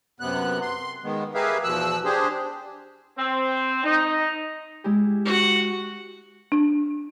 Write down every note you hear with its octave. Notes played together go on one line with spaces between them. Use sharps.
F#2 C3 B3 F#6
C6
D#3 G#3 B3
G4 G#4 A#4 B4 E5 F5
E2 B2 F3 E6 F#6
D4 G4 G#4 C5
C4
D#4
G#3 E4 G4
F#4 F#5
D4